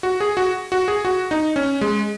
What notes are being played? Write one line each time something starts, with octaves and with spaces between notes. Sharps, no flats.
F#4
G#4
F#4
F#4
G#4
F#4
D#4
C#4
G#3